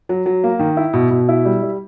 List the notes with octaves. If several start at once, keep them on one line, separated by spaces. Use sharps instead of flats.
F#3
F#3
A#3
D#3
E4
B2
B2
E4
G3
G3